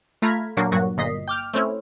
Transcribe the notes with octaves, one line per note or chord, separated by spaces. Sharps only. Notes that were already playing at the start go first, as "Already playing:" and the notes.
A3 F4 A#5 B5 F6 G#6
A#2 F#3 A#3 D4 F#4
G2 A#2 F#3 F#4
G1 A#2 D#5 B6 C7
G5 D6 F6
A3 C4 C#4 E4